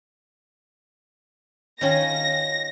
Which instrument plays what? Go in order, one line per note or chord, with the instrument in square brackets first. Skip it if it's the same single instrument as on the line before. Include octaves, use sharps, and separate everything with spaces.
[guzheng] D#3 C#4 F4 [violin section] A#6